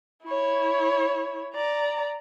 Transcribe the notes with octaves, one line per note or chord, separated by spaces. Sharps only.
E4 C#5
D5 A#5